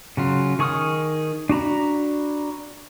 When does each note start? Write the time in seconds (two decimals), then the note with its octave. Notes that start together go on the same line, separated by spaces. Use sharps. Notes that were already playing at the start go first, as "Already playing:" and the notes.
0.17 C#3 F#3 F4
0.59 D#3 G#4 C#6 D#6 F6
1.49 D4 F#4 A#5 B5